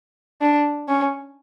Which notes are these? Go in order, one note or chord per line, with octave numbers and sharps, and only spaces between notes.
D4
C#4